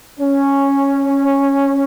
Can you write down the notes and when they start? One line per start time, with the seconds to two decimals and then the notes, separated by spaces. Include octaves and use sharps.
0.20 C#4